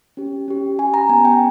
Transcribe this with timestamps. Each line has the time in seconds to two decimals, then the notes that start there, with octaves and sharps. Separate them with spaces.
0.17 C#4 G4
0.48 C#4 G4
0.79 C#4 G4 G#5
0.94 A#5
1.09 B3 G#5
1.13 G4
1.25 G5